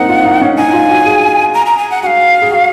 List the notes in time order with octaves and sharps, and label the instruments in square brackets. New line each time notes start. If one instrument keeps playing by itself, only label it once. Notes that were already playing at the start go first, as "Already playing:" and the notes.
Already playing: [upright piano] A#3 C4 D#4 [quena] F#5
[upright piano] F4
D#4
C#4
[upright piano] D#4 [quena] G#5
[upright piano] D#4
F4
F#4
G#4
[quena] A#5
A#5
G#5
F#5
[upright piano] F#4 [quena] F5 F#5
[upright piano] G#4
F#4